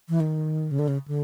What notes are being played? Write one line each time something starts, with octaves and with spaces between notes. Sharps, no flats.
E3
D#3
C#3
D3
C#3
D3